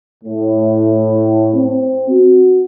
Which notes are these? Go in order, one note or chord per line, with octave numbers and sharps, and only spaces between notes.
A2
C4
F#4